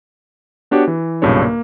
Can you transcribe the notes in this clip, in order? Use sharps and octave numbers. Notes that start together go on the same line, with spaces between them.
B3 D4 F#4 G4 C#5
E3
B1 G2 A#2 C#3 D4 C#5
A#3